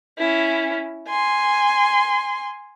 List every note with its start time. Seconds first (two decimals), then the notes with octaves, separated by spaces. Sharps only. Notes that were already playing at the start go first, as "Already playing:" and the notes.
0.18 C#4 E4
1.08 G#5 C6